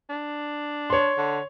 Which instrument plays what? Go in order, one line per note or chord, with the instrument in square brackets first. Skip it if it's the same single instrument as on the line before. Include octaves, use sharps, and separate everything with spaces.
[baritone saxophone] D4
[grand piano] C#5 C6
[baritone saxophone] D3